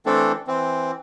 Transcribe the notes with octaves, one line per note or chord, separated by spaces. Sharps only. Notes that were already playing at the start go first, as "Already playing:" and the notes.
E3 A3 C4 D4 A4
E3 C4